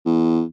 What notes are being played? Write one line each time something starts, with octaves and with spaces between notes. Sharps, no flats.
E2